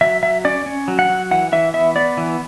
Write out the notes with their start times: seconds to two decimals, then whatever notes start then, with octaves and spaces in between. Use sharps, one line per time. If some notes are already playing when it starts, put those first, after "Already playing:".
0.01 F#3 E5
0.23 F#3 E5
0.45 C#4 D5
0.66 C#4
0.88 F#3
0.99 F#5
1.09 F#3
1.31 E3 F#5
1.52 E3 E5
1.74 B3 E5
1.96 B3 D5
2.17 E3